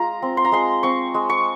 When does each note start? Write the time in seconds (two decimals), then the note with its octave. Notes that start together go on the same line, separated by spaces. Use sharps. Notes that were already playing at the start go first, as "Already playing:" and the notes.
Already playing: G#3 F4 A#5
0.22 C4
0.37 C6
0.45 A#5
0.52 G#3 C6
0.83 C4 C#6
1.14 G#3
1.30 C#6